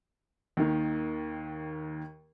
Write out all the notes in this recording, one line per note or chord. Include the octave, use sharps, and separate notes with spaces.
D#2 D#3